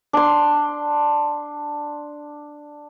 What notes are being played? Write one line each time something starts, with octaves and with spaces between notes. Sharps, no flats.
D4 C6